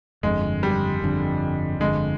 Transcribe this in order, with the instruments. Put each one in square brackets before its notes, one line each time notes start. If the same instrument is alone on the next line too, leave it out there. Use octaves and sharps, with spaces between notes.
[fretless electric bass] G1 F2 D3 [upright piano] G#3
[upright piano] G3
[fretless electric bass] G1 F2 D3
[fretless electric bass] G1 F2 D3 [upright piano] G#3